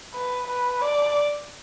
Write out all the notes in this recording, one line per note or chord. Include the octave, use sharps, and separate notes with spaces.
B4
B4
D5